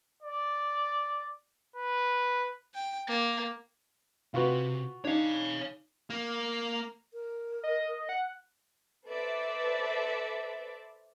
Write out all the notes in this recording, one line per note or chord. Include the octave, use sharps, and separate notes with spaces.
D5
B4
G5
A#3
C3 F4 F#4 B4
D4 D#4 C#5 F5
A#3
A#4
D#5
F#5
A4 B4 C5 D5 E5